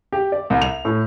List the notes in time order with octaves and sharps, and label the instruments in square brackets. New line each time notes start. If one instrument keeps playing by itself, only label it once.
[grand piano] G4
D5
C2
F7
A2